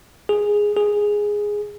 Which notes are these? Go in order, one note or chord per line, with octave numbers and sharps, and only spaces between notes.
G#4
G#4